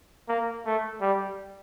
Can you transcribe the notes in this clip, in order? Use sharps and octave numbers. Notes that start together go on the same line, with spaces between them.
A#3
A3
G3